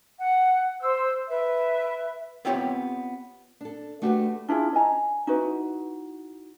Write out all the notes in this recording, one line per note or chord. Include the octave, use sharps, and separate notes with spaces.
F#5
C5 E6
B4 E5
B3 C4 F4 G4 C#5
D4 A4
A3 D4 F#4 G4 A4 B4
D4 E4 F4 G#4
D5 D#5 G#5 A#5
D#4 E4 F#4 B4